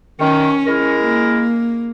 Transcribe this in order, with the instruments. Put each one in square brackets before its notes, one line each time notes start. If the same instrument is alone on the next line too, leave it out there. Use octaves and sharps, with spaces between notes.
[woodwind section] D#3 [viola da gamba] C#4
[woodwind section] G#3 E4 A#4
[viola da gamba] A#3